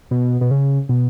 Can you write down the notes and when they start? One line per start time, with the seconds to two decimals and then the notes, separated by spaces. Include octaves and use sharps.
0.11 B2
0.41 B2
0.51 C#3
0.89 B2